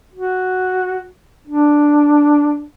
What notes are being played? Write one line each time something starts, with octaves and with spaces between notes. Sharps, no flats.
F#4
D4